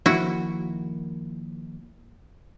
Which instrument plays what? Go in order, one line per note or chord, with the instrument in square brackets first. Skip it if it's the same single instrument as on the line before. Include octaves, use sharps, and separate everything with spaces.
[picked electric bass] D#3 F3 A#3 [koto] E4 F#4